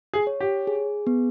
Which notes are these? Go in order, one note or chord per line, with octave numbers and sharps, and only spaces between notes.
G#4
C#5
G4
G#4
B3